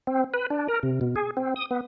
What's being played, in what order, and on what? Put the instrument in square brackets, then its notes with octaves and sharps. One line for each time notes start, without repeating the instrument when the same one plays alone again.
[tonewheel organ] C4
B4
D4
A#4
C3
B2
G#4
C4
D#6
B3